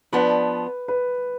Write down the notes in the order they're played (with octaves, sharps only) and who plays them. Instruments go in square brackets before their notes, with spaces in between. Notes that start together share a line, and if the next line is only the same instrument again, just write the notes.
[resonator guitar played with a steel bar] F3 B3 D4 [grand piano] B4
[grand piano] B4